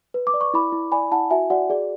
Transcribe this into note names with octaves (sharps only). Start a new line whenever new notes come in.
B4
D6
D5
C#6
E4 B5 D6
E4
D5 G#5 B5
E4 F#5 A5
F#4 E5 G#5
F#4 D5 F#5
G#4 D5